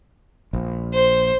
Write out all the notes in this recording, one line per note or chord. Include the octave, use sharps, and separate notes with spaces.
A#1
C5